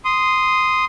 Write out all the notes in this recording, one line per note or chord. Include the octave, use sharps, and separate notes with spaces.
C6 D#6